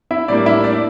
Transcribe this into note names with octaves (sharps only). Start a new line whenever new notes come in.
E4 E5
A2 G3 A#3 D4 D5
E4 E5
D4 D5